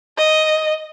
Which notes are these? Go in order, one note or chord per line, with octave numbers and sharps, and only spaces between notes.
D#5